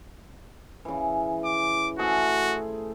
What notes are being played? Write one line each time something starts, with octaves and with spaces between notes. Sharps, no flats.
C#3 E3
D6
A3 F#4 G#4 C5